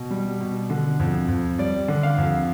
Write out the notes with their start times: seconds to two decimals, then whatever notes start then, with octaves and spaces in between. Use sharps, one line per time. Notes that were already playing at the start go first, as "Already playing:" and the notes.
Already playing: B2
0.11 G3
0.40 B2
0.70 D3
0.99 F2
1.29 F2
1.59 G3 D5
1.88 D3
2.03 F5
2.18 F2